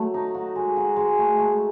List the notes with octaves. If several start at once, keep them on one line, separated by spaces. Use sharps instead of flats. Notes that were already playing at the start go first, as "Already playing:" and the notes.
Already playing: F#3 A3 A4
D#4
F#4
G#3
F#4
G#3
A3
A3